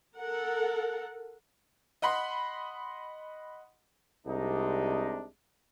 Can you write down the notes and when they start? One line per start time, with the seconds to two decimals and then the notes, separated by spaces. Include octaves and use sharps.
0.17 A4 A#4 F#5
2.02 D#5 F#5 B5 C6
4.27 C2 C3 G#3 D4 D#4 D#5